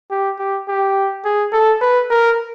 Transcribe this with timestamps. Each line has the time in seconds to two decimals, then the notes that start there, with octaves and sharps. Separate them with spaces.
0.10 G4
0.39 G4
0.68 G4
1.25 G#4
1.53 A4
1.81 B4
2.11 A#4